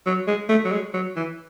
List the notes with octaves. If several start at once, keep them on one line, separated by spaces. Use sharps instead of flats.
F#3
G#3
A3
F#3
G#3
F#3
E3